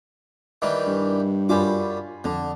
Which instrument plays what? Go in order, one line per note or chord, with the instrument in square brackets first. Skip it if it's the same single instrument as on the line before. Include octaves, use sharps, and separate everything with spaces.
[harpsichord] D#3 E3 G3 [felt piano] D6
[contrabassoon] G2
[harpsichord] F#2 G3 D6 [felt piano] F4 G#5 B5
[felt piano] F2 A5 [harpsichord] D3